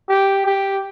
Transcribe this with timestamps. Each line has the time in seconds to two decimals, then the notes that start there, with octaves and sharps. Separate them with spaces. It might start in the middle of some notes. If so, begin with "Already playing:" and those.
0.09 G4
0.46 G4